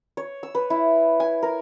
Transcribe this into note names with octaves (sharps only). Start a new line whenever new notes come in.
C#5
E6
B4
E4
G#5
A#4